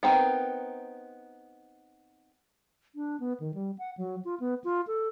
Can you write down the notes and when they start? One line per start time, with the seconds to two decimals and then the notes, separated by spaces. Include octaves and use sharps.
0.03 B3 C4 D#4 A#4
2.95 D4
3.20 B3
3.40 D#3
3.54 G3
3.78 F#5
3.97 F#3
4.25 F4
4.40 B3
4.64 F4
4.87 A4